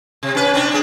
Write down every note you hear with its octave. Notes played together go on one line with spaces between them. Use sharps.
C3
C#4 B4
C4 D4
D4 G#4